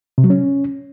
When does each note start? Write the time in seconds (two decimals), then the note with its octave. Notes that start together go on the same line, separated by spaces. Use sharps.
0.18 C3
0.24 F#3
0.30 C#4